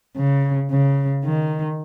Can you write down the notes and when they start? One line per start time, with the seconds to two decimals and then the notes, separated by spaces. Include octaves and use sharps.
0.17 C#3
0.71 C#3
1.25 D#3